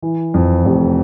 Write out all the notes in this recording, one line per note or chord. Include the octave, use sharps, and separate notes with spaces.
E3
F2
F1